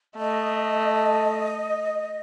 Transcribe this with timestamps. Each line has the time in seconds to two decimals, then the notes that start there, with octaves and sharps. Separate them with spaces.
0.18 A3 D#5